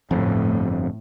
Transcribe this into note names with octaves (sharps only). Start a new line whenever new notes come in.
G1 F2 A2